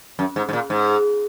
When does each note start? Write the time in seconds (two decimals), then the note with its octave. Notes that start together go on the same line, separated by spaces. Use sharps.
0.19 F#2
0.36 G#2
0.49 G#2
0.53 A#2
0.70 G#2